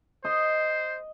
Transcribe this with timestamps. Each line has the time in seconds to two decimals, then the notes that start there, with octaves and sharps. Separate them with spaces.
0.25 C5 D#5